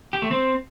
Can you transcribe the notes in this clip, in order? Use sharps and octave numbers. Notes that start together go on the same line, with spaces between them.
G4
A3
C4